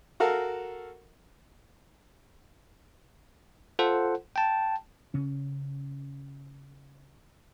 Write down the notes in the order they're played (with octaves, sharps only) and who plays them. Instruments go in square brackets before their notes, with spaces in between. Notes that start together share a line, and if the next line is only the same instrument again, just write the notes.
[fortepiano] F#4 A4 A#4 F5
[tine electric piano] F4 A4 C5 F#5
G5 A5
[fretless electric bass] C#3 C#4